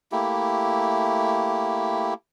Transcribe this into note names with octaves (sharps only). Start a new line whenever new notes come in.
A3 A#3 E4 G4